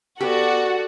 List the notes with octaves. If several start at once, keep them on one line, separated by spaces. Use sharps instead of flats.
B3 F#4 G4 A4 D5